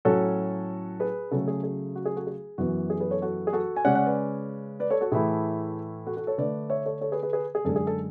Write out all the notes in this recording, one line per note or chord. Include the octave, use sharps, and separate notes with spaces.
A2 F#3 C#4 F#4 A4
G#4 B4
C#3 F#3 A3 F#4 A4
G#4
G#4
F#4
G#4
F#4 A4
G#4
F#2 E3 B3 F#4
G#4
G#4 B4
A4 C#5
F#4 A4
G#4
F#4 A4
G#5
C#3 G#3 C#4 D5 F#5
D5 F#5
B4 D5
B4 D5
A4 C#5
F#4 A4
A2 E3 A3 E4 G#4
F#4 A4
F#4 A4
A4 C#5
D3 A3 D4 B4 D5
C#5 E5
A4 C#5
A4 C#5
G#4 B4
G#4 B4
G#4 B4
G#4
F#2 D3 G#3 A4
G#4
A4